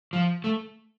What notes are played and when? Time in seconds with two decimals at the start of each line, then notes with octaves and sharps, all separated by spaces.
0.13 F3
0.44 A3